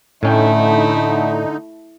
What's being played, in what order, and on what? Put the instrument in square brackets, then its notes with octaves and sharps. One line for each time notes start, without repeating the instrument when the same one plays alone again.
[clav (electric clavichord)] A2 C#4 G5 [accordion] D3 D#4 [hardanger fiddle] A3 E4